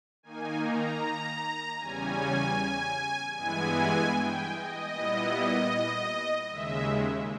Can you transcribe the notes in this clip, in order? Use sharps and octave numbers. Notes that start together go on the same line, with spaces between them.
D#3 A#3 D#4 G#5
A#5
E2 C#3 G3 C#4 G#5
G2 E3 G#3 B3 E4 G#5
G5
D#5
A#2 G3 B3 E4
D#2 C#3 G#3 E5